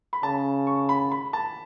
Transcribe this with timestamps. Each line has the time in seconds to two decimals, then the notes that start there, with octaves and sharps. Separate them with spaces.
0.13 B5
0.23 C#3 A5
0.67 C#6
0.89 B5
1.12 B5
1.33 A5